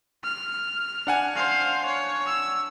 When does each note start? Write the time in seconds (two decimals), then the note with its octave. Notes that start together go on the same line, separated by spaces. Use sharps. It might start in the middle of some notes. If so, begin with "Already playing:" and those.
0.24 F6
1.07 D4 F#5 G#5
1.36 C5 F5
1.86 C#5
2.26 E6